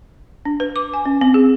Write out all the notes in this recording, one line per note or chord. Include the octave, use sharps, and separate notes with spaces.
D4
B4
D6
G#5
C#4
C4
G#4